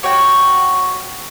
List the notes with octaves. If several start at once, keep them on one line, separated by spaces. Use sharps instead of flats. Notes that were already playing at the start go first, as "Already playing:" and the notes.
F#4 C#5 G5